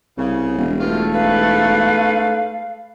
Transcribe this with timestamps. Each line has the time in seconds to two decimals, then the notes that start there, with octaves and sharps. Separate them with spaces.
0.18 C2 C#3
0.58 E1
0.79 G2 A3 F4
1.13 G#2 B4 F5